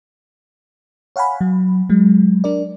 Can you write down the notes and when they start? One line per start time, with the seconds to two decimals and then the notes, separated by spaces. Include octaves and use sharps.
1.16 C#5 F5 F#5 G#5 B5
1.41 F#3
1.89 F#3 G#3
2.44 D4 A#4 D5